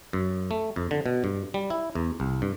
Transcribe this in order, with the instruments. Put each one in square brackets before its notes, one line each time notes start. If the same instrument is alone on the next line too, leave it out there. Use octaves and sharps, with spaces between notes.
[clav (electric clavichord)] F#2
A3
F2
D3
B2
G2
G3
E4
E2
C2
G2